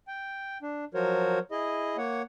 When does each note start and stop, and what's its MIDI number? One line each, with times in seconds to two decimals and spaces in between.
0.08 0.58 79
0.62 0.85 62
0.94 1.39 53
0.94 1.39 54
0.94 1.39 66
0.94 1.39 70
0.94 1.39 72
0.94 1.39 73
1.51 1.97 64
1.51 1.97 68
1.51 1.97 75
1.98 2.22 58
1.98 2.22 73
1.98 2.22 78